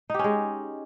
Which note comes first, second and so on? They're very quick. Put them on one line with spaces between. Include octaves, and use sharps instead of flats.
D#4 G4 C#4 G#3